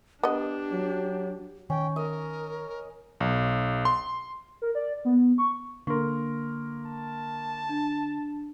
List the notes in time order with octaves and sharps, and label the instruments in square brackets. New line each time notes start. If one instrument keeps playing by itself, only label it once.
[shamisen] B3 D#5 [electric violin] D4 [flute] G4
[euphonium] F#3
[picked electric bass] D#3 [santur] C#4 [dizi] G5
[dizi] A#4 [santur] D#5
[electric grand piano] B1
C6
[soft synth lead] A#4
D5
B3
C#6
[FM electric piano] D3 [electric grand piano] A#3 A#4 [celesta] C6 C#6
[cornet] A5
[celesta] D4